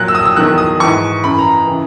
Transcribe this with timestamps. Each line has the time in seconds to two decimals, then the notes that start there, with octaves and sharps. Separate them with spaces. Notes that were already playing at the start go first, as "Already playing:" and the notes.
Already playing: A#2 F#3 F#6
0.08 E6
0.15 D#6
0.25 E6
0.36 E2 D#3 F#3 F#6
0.58 D#6
0.80 G#2 E3 C#6
1.24 F#2 E3 B5
1.39 A#5
1.67 C#3 E3